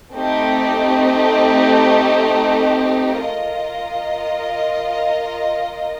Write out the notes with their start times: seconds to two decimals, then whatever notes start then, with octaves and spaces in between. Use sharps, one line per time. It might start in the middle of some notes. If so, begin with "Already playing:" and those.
0.14 A3 C4 D#4 G4
3.19 F4 A#4 D#5